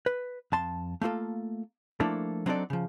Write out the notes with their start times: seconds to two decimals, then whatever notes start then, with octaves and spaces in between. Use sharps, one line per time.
0.06 B4
0.52 F2 A5 C6
1.01 A3 A#3 F4 A4
2.00 F3 A3 A#3 D4 E4 A4
2.46 F#3 C4 D4 D#4 A4 D5
2.70 C#3 F3